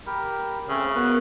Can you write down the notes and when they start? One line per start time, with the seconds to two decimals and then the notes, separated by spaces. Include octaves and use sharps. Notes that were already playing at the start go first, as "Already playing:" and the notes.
0.07 G4 A#4 B5
0.69 C#3 A3 C4 C#4
0.95 B3 F#4 A#4 B4